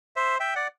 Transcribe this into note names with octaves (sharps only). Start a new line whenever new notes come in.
C5 E5
E5 G5
D5 F#5